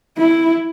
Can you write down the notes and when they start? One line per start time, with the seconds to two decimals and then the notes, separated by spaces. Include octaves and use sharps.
0.18 E4